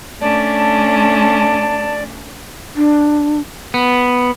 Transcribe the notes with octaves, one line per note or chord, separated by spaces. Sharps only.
A3 C#4 D4 D5 A5
D4
B3